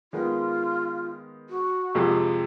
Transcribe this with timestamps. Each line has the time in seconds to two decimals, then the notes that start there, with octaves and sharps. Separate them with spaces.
0.13 D#3 G#3 B3 F4
1.50 F#4
1.95 F2 C3 F3 G#3